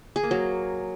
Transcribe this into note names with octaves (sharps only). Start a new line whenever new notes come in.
G#4
A#3
F#3